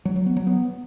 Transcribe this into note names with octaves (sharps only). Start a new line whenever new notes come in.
F#3
F#3
B3
F#3
B3